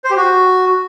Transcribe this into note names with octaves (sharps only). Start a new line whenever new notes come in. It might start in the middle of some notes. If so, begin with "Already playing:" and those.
C5
G4
F#4